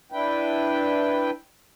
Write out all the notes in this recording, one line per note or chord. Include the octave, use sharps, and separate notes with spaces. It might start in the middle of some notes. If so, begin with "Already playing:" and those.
D4 E4 B4 G5